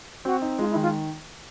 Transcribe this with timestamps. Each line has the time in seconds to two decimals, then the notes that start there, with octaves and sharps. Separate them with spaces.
0.25 C4 F#4
0.42 D#4
0.58 G#3 F4
0.70 E4
0.75 D#3
0.82 F4